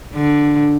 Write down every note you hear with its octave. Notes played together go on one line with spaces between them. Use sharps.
D3